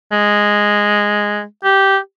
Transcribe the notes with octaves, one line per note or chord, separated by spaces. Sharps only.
G#3
G4